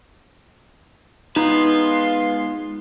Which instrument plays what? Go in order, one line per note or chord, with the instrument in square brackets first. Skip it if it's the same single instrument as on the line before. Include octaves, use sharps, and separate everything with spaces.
[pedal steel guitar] G#3 B3 [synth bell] D#4 [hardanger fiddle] F4 C6 [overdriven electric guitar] B4